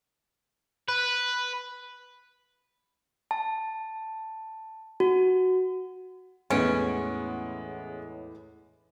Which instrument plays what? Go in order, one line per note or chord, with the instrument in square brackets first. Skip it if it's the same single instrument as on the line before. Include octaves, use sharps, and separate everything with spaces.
[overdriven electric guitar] B4
[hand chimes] A5
F#4
[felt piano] E2 A2 D7 [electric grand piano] G#3 [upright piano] B3 [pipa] C#4